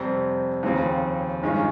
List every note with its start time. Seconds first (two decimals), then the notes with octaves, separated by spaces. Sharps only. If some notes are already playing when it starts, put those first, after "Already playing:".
Already playing: F2 C3 G3 C4
0.63 D#2 C#3 F3 C4
1.42 G2 D#3 G#3 C#4 F4